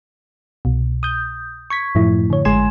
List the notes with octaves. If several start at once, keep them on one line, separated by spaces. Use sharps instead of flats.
C2 B2
D#6 G6
C#6 G#6 B6
F#2 A2 F3 A3 E4
D3 C#5
G#1 G#3 G#5 C6 G#6 E7